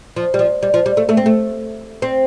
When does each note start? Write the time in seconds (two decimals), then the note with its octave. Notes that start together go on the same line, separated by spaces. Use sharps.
0.16 F3
0.34 G3
0.39 F3
0.63 G3
0.74 F3
0.86 G3
0.97 A3
1.09 A3
1.17 C4
1.26 A3
2.02 C4